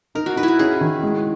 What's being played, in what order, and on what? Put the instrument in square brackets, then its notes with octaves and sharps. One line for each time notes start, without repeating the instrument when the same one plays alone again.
[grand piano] D#4 [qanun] A#4
[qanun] F#4
[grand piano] D#4 [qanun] B4
[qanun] E4
F#4
[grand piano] C#4 [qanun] G#4
[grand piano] D#3
G#3